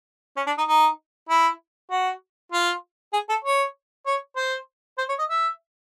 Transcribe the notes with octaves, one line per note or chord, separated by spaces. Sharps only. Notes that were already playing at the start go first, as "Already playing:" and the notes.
C#4
D4
D#4
D#4
E4
F#4
F4
G#4
A4
C#5
C#5
C5
C5
C#5
D#5
E5